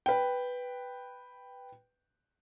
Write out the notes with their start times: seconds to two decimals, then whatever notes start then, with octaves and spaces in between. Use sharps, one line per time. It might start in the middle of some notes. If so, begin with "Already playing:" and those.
0.06 B4 G5